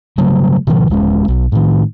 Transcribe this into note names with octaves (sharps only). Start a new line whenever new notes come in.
C#3 F#3 G3 A3
B2 D#3 F3
D#1 G#3 C#4
B1
A2 D#3